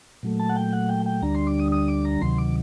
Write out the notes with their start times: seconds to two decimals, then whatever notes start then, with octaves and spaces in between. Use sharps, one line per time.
0.23 A#2 F#3 A3
0.40 A5
0.49 F#5
0.56 G5
0.73 F#5
0.89 G5
1.06 G5
1.22 D2 D3 G3 D4 A#5
1.35 C6
1.47 D6
1.59 D#6
1.72 D#6
1.88 D6
2.05 A#5
2.21 D2 C3 D#3 F#3 C6
2.38 D6